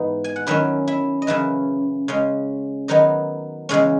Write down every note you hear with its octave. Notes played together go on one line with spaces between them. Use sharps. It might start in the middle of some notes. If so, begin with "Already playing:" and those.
Already playing: G#2 E3 B3 D#4
G#5
F#5
F#2 D#3 F#3 C#4 E4 E5
E4 E5
D#5
F#2 C#3 E3 E4 E5
C#3 G#3 C#4
D#3 F#3 B3 D#4 D#5
E2 C#3 G#3 C#4